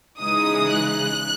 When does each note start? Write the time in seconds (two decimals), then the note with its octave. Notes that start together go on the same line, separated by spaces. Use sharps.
0.20 C#3 E3 G#3 D#4 D#6
0.72 F#6